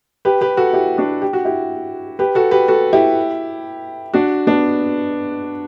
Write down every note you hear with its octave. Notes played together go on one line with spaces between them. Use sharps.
G4 B4
G4 B4
F#4 A4
E4 G4
D4 F#4
G4
F#4
E4 G4
G4 B4
F#4 A4
G4 B4
F#4 A4
E4 G4
D4 F#4
B3 D4